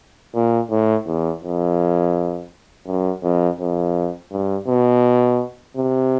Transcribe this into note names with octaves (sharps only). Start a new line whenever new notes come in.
A#2
A2
E2
F2
F#2
F2
F2
G2
B2
C3